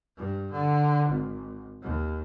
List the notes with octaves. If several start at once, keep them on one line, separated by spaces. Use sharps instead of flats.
G2
D3
G#1
D#2